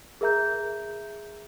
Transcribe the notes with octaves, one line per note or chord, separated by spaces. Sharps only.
G#4 A#4 E5 A#5 G6